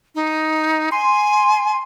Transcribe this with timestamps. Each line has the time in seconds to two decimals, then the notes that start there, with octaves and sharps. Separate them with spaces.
0.15 D#4
0.92 G#5 C6